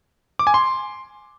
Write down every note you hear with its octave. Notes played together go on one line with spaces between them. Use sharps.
D6
G#5
C6